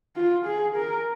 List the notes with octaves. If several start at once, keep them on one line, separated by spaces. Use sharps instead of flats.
F4
G#4
A#4